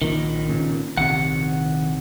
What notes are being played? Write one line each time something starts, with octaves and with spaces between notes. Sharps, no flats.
B1 A#2 D#3
A#2 C#3
A#1 C3 D#3 F#5